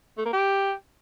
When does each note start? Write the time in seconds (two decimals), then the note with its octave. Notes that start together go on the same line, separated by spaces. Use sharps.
0.18 A3
0.25 A#3
0.33 G4